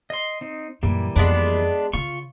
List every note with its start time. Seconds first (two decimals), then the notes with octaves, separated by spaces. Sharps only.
0.10 D#5 C6
0.41 C4 D#4
0.83 F#2 A#2 E3 G3 A#3
1.16 F2 G#3 B3 D4
1.93 C#3 F4 C#6